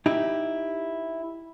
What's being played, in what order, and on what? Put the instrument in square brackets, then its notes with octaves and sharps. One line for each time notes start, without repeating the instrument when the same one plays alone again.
[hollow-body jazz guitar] D#4 E4 G4